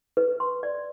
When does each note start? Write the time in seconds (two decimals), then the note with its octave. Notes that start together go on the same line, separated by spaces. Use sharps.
0.17 B4
0.40 C6
0.63 D5